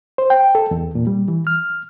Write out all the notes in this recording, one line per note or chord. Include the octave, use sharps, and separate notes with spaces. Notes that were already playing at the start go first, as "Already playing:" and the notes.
C5
G5
A4
E2
A#2
G3
E3
F6